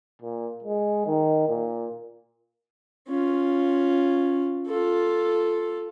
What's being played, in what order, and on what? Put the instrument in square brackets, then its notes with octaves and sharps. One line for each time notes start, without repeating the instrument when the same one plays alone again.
[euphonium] A#2
G#3
D#3
A#2
[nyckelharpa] C#4 F4
F4 A4